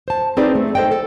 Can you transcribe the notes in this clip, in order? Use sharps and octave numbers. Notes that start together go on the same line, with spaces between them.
C5 A5
C4 D#4 G#4 B4 C5 D5
A3
A4 C5 D5 D#5 G5
A4